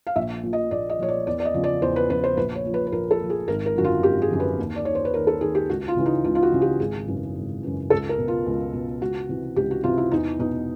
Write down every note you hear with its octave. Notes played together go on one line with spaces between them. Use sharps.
F5
A#1 E5
A#2 F3
D#5
A#1 D5
D#5
A#2 F3 C#5
D5
E2 D5
D5
D#5
C#3 F3
D5
E2 C5
B4
C#3 F3 B4
C5
A#1 B4
C#5
A#2 F3
B4
B4
A#1 A#4
A4
A#2 F3
G#4
G#1 A#4
A#4
F#2 D3 F3 F#4
F4
G#1 G4
G#4
F#2 D3 F3
B4
D#2
D5
D#3 C#5
C5
B4
D#2 A#4
A4
D#3 G#4
G4
C#2 F#4
F4
C#3 E3
D#4
C#2 F4
F4
F#4
C#3 E3
G4
G#1 G#4
F#2 C#3 E3
G#1
F#2 C#3 E3
C#2 A4
A#4
B2
F4
C#2
B2
C#2 F#4
C3 E3
C#2 G4
F#4
C3 E3 F4
E4
E2 D#4
B2 D#4